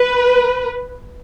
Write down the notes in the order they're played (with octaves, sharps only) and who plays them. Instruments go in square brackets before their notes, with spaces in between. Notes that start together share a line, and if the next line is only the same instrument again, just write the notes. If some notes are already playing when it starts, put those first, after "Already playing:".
Already playing: [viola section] B4